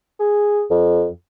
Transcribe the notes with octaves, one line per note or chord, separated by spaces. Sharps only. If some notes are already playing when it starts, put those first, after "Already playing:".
G#4
F2